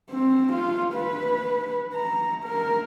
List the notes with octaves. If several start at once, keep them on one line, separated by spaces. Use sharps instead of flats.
C4
F4
B4
A#5
A#4